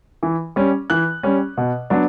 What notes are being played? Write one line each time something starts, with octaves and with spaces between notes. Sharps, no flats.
E3
G3 C#4
E3 F#6
G3 C#4
B2
F#3 B3 D4